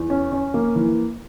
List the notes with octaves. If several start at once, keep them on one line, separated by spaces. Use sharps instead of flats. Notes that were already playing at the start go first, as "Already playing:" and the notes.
Already playing: E2
C#4
C#4
A#3
E3